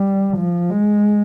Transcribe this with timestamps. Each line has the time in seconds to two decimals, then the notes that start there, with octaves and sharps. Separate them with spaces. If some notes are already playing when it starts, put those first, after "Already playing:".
Already playing: G3
0.37 F3
0.70 G#3